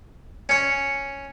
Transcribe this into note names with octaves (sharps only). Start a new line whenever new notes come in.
C#4 C#5